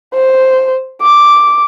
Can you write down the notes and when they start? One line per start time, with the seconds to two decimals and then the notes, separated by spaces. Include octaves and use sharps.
0.14 C5
1.02 D6